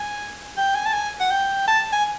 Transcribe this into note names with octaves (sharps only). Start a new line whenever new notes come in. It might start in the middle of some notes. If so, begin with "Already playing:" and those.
Already playing: G#5
G5
G#5
A5
G#5
F#5
G5
A5
G#5